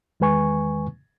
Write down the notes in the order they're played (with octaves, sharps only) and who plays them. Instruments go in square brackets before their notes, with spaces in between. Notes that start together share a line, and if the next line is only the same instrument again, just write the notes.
[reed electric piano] E2 D#3 G#3 B4 G#5 C#6